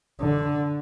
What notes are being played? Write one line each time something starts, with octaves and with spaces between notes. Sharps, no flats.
D3